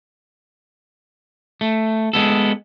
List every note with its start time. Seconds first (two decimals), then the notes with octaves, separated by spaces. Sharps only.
1.61 A3
2.13 G#3 B3 A4